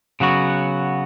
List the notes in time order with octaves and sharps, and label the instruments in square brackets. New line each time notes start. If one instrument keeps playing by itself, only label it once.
[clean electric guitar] C#3 F#3 B3 F#4